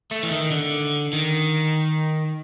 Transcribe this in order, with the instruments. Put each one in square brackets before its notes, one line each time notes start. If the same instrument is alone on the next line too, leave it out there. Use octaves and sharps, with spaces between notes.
[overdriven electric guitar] A3
E3
D#3
D3
D#3